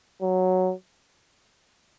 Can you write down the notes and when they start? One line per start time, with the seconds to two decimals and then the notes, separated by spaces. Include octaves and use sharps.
0.22 F#3